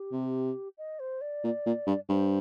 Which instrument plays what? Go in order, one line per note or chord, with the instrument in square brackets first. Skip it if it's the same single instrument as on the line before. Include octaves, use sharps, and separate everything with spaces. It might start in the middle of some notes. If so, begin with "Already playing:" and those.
Already playing: [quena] G4
[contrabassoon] C3
[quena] D#5
C5
D5
[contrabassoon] A#2
A#2
G2
[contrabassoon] G2 [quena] C5